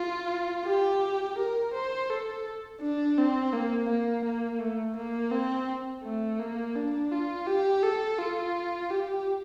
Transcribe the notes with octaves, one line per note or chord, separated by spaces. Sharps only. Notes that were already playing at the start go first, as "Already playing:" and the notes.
Already playing: F4
G4
A#4
C5
A4
D4
C4
A#3
A#3
A#3
A3
A#3
C4
A3
A#3
D4
F4
G4
A4
F4
G4